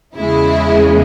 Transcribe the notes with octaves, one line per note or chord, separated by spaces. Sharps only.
E2 C#3 G#3 E4